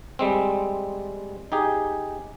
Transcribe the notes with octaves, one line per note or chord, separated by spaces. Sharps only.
G3 G#3 C4
D#4 G4 G#4